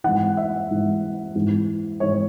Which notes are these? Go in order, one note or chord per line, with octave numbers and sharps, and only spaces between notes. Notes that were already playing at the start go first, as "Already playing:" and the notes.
G#2 E3 F#5
E5
G#2 E3
G#2 E3
G#2 E3 C#5